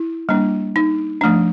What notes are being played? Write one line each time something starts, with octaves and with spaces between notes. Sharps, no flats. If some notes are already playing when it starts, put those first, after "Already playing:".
Already playing: E4
G3 A#3 D4
D#4
F3 A3 D4